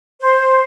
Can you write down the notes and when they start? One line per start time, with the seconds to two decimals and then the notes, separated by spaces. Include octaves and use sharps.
0.21 C5